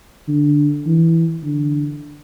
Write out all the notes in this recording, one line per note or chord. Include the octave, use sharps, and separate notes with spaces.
D3
E3
D3